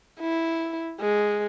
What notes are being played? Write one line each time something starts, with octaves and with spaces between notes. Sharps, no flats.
E4
G#3